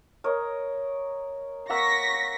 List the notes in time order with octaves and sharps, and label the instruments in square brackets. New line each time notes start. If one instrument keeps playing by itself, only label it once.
[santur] A#4 C#5 D#5
[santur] A#3 F#5 E6 [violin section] C#6 A#6 B6